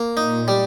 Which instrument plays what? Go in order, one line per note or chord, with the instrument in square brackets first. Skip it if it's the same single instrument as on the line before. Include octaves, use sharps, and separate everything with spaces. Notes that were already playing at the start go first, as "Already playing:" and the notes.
Already playing: [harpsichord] A#3
[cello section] A#2 [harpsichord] D#4
[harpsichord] G3